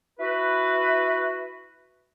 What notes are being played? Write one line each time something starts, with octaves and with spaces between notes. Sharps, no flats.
E4 F#4 B4